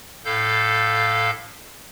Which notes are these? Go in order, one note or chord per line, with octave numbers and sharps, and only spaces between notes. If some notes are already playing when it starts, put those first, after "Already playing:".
A2 A4 F5 G6